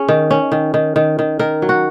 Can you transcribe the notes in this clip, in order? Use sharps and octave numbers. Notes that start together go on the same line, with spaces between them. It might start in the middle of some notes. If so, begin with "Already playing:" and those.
Already playing: C#4 G#4
D#3
C#4
D#3
D#3
D#3
D#3
D#3 A#4
F#3
F#4